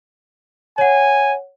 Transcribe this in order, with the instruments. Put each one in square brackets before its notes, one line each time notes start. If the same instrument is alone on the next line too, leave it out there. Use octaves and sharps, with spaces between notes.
[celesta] C#5 F#5 [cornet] G#5